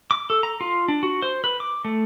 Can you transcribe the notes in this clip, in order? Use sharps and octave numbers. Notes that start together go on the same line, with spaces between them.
D6
A4
A#5
F4
D4
F#4
C5
B4
D6
A3